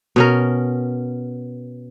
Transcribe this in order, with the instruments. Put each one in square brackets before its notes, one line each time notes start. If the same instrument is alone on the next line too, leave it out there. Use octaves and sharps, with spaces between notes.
[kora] B2 C#4 A#4